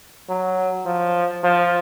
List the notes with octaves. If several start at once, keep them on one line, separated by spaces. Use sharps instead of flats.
F#3
F3
F3